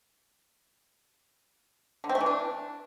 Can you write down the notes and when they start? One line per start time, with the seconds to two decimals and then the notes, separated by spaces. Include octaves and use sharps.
2.04 D3
2.09 C4
2.15 A3
2.21 E3
2.26 D4